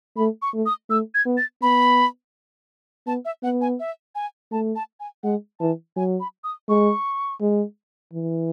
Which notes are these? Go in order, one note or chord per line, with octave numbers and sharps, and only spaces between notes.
A3 B5
C#6
A3
D#6
A3 E6
G#6
B3
A6
B3 B5
B3 A5
E5
B3 F#5
G#5
E5
G#5
A3 A5
A5
G#5
G#3 F#5
E3 A5
F#3 G#5
B5
D#6
G#3 C#6
G#3
E3